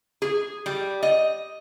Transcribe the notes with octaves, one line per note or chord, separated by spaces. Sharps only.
G#4
G3
D#5